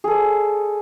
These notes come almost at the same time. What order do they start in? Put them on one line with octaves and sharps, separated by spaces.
G#4 A4 D5 C5